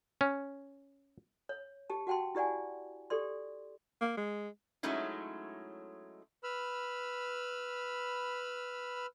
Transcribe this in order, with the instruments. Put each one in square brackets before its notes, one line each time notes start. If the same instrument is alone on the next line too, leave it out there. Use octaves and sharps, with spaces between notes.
[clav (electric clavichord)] C#4
[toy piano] C#5
G4 A5
F#4 F#5 G5 A5 C6
E4 G4 D5 F#5 G#5
G4 A4 D5 C6
[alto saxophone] A#3
G#3
[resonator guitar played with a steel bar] F#3 G#3 A3 C#4 D#4 E4
[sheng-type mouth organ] B4 B5 E6 F6